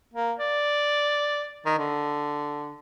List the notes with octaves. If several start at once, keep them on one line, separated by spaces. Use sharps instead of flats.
A#3
D5
D#3
D3